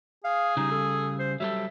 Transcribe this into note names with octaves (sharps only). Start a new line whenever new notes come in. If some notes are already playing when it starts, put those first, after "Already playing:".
G#4 F5
C#3 G3 D#4
A4
C5
F#3 G3 A4 E5